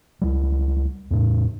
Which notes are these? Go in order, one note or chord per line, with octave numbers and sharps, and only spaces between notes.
C#2 G3
E2 A2